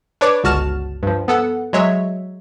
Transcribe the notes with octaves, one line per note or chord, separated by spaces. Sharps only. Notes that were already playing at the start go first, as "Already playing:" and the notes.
D4 B4 C#5 D5 A5 D6
G1 C#2 F#4 A5 F6 E7
G2 F3
B3 A4 F#5
F#3 G#3 C#5 E5